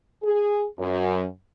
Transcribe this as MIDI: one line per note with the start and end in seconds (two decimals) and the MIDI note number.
0.23 0.65 68
0.78 1.25 42